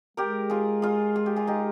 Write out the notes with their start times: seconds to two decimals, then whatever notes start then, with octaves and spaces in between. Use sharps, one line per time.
0.17 G#3 G4 A#4
0.50 F4 G#4
0.82 F4 G#4
1.16 G#4
1.26 G4
1.36 F4 G#4
1.47 D#4 G4